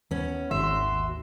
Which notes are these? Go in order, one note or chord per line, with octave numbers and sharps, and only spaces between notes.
D#2 B3 C#4
G#1 F#4 E5 C6